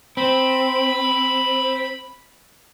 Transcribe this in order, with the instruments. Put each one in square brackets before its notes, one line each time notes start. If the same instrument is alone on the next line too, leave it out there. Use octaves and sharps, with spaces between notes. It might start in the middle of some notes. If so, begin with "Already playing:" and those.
[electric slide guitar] C4 [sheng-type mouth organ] B5